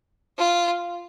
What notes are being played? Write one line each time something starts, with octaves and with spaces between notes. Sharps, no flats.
F4